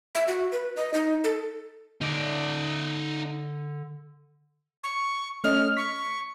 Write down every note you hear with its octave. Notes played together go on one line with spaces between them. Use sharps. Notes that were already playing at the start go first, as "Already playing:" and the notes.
E5
F#4
B4
D#5
D#4
A4
D3 D#4 D5
C#6
A3 C#4 D#5 F6
C#6 B6